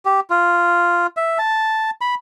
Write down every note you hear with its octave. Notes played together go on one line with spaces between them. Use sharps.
G4
F4
E5
A5
B5